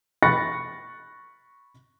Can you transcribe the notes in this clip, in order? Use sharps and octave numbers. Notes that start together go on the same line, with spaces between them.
B5 C#6 F#6 A6 A#6 C#7